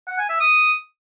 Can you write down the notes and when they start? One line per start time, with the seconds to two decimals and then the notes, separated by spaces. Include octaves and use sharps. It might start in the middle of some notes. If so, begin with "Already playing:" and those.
0.08 F#5
0.18 G#5
0.29 E5
0.40 D#6